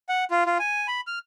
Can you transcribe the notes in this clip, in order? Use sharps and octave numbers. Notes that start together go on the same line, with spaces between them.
F#5
F4
F4
G#5
B5
F6